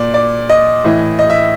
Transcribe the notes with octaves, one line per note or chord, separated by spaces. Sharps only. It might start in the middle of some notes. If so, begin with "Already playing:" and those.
Already playing: A#2 D5
D5
D#5
A2 E3
D#5
E5